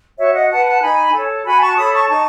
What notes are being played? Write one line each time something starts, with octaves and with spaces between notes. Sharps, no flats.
F#4 C#5 E5
D#5 F#5
B4 F#5 A5
F#5 A5
D#4 G#5 B5
A4 C#5
F#4 G#5 B5
A5 C#6
C#6
A4 C#5 B5 D#6
A5 C#6
D#4 A5 C#6